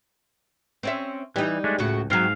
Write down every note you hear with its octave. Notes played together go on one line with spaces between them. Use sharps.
C4 C#4 E5
E3 G3 D#4
G#3 A3 D4
C#2 A2 C#3 F#4
G#2 F#3 C4 F5